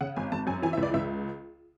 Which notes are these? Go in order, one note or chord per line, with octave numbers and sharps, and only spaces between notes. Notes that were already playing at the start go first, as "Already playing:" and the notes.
C#3 F#5
G#1 G#5
G#1 A5
F#2 G#5
E3 G#5
E5
C#2
D5
C#2 E5